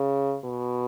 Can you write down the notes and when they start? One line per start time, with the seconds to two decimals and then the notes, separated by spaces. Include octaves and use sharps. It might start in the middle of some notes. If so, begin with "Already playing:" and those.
Already playing: C#3
0.44 B2